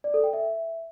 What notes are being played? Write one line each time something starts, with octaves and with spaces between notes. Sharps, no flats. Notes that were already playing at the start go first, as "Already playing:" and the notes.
D5
A4
G5
E5